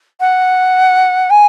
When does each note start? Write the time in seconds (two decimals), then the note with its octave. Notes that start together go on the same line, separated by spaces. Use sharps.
0.20 F#5
1.30 G#5